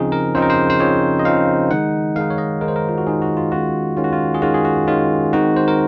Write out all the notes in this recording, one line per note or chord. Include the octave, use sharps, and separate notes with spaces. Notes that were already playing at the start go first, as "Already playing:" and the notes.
Already playing: C#3 F3 C4 D#4 G#4
A#4
C#3 F3 C4 D#4 C5
A#4
C5
C5
C#3 F3 C4 D#4 C#5
D#5
C#3 F3 C4 D#4 F5
D#3 G#3 D#4 F#5
D#3 G#3 D#4 F5
C#5
D#5
D#3 G#3 D#4 A#4
C5
A#4
F4
F#4
D#3 G#3 D#4 G#4
F#4
F4
D#3 G#3 C#4 F4 F#4
D#3 G#3 C#4 F4
F#4
F4
G#4
D#3 G#3 C#4 F4 F#4
G#4
F#4
D#3 G#3 C#4 F4
D#3 G#3 C4 D#4 F#4
C5
A#4